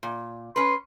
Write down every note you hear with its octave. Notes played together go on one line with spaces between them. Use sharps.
A#2
C#4 B4 C6